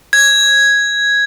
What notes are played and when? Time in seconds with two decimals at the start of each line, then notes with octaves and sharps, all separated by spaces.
0.13 G#6